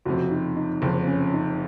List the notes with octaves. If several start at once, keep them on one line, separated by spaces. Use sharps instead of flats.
F#1 F2 C3 F#4
D#4
D#4
F#1 F2 C3 C4
C#4
D#4